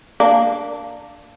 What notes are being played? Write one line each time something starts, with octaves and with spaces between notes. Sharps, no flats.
A#3 D4